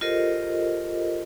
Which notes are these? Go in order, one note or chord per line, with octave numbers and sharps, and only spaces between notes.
F4 G4 A4 A#4 C5 D#5